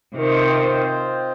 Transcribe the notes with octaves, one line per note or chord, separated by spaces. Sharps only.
C3 D#3 C4 F4 C5 D#5 G5